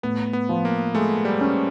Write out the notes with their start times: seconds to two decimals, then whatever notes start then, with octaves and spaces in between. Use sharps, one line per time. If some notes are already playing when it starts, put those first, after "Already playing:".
0.03 A2 B3
0.33 B3
0.49 F3
0.65 A#3
0.95 G#3 A3
1.25 G3
1.41 C#4